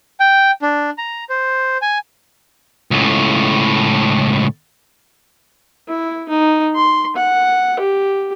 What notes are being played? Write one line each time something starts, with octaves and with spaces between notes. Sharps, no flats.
G5
D4
A#5
C5
G#5
C#2 A2
E4
D#4
C6
F#5
G4